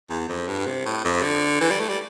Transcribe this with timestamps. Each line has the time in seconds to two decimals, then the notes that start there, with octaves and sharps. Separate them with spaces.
0.10 E2
0.29 F2
0.48 G2
0.66 C3
0.85 A2
1.05 F2
1.23 D3
1.61 E3
1.70 G3
1.80 A3
1.89 G3